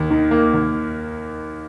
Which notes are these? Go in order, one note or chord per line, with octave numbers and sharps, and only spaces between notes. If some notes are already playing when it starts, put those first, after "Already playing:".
Already playing: D#2
D#3
A#3
D#2